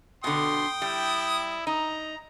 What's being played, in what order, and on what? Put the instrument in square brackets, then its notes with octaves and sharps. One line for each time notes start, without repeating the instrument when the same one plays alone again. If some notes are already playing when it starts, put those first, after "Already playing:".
[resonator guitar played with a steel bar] B2 D3 [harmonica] G5 D#6 [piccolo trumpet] C6
[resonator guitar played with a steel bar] G3 [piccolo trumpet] E4
[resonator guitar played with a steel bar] D#4 [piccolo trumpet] A#5